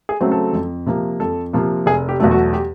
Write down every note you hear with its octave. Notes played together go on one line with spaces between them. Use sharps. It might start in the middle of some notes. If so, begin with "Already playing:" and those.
G#4
C#3 F#3 A3 C4
A4
F2
C3 F3 A#3
F2 A4
C3 F3 A#3
F1 G#4
G4
E2 B2 F#3 A3
F#4
G4